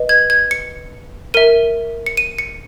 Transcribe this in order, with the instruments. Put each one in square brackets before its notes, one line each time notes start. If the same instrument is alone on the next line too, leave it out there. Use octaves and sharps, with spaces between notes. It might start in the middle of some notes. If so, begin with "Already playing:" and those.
Already playing: [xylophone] B4 D#5
G#6
G#6
C#7
A#4 E5 D#7
C#7
D#7
C#7